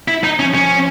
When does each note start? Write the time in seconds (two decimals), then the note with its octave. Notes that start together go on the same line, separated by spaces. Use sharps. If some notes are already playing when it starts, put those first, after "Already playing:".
0.08 E4
0.24 D#4
0.39 F3 C#4
0.54 C#4